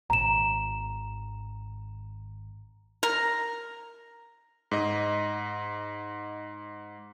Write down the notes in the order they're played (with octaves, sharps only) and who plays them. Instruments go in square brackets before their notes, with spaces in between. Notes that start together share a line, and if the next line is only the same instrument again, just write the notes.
[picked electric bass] G#1 [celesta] A#5 E7
[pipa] A#4
[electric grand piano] G#2 D#5